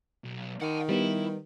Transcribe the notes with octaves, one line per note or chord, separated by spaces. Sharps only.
B1
D#3 F#5 A5
G3 B3 E4